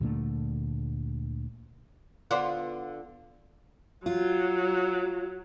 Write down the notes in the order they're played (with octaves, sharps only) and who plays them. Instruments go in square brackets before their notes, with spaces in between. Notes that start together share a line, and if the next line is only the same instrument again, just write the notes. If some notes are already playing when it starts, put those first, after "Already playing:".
[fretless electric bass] D2 A#2 D3 A3
[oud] D3 B3 F4 [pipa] C5 D5 F#5
[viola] F#3 [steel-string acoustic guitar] F4